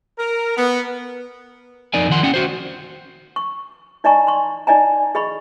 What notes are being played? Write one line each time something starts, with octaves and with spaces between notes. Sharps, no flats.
A#4
B3
F2 D#4 A#4 D5 G#5
D#3 F3 F#5 C6
G3 C#4 F#5 G5
F#4 C5
C#6
D#4 D5 D#5 G#5 A#5 C#6
C6 C#6
D#4 D5 D#5 G#5 A#5
G#4 D#5 B5 C#6